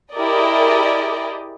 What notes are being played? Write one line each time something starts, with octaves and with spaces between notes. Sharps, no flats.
E4 G4 G#4 A#4 D5 D#5